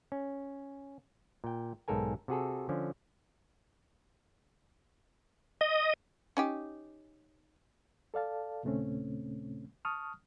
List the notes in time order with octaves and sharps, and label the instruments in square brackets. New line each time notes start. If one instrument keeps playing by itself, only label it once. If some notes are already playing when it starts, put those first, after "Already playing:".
[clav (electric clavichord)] C#4
A#2 G5
B1 G#2 A4 A#4 G#5
C3 F#4 G#4 A4
D3 F3 C#4
[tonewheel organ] D#5
[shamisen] C#4 D#4 G4
[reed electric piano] A4 D5 F5 A5
D#2 A#2 C#3 A3 C4 C#4
A5 C#6 D#6 F6